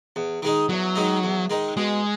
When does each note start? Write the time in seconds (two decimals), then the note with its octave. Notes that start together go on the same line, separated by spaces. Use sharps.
0.16 E2
0.42 D#3 G#3 D#4
0.69 E2 F#3
0.96 D#3 G#3 D#4
1.24 E2
1.50 D#3 G#3 D#4
1.77 B2 G#3